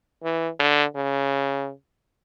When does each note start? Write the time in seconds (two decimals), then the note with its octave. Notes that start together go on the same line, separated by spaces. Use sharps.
0.24 E3
0.60 D3
0.96 C#3